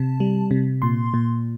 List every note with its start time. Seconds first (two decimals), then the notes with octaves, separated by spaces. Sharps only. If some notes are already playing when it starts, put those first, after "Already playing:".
Already playing: C3 A5
0.20 G3
0.51 C3
0.82 A#2 C6
1.14 A#2